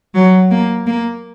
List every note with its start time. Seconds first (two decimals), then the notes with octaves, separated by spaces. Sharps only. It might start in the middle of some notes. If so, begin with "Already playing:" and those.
0.15 F#3
0.51 A#3
0.87 A#3